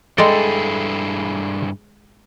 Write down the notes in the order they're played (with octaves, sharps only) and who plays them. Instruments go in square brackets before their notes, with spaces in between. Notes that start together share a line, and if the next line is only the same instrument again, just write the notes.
[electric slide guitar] G2 E4 G#4 [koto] G#3 D5 [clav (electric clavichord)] A4 G5 A#5